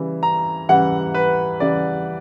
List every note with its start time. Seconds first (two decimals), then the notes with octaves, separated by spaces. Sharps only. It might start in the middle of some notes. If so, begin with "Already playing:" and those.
Already playing: C#3 E3 G3
0.23 A#5
0.69 C#3 E3 G3 F#5
1.14 B4
1.60 C#3 E3 G3 D5